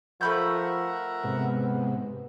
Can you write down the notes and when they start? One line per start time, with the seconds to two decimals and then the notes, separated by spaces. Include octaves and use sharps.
0.21 F3 A3 A#4 E5 F#5 B5 G6
1.23 G#2 C3 B3